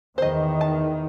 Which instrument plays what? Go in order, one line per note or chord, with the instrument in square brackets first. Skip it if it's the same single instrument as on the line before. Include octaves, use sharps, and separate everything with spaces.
[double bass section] E2 D#3 [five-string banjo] C5 D#5
[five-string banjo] A5